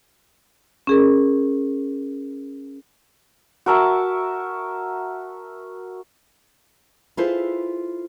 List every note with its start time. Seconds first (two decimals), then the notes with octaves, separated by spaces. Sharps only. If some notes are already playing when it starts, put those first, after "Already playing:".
0.87 C#4 G#4 A#4
3.66 F#4 A#4 E5 A5
7.17 E4 F4 G#4 A4 B4 C5